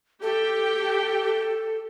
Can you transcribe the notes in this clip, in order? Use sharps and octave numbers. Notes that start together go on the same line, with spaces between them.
G4 A4 G5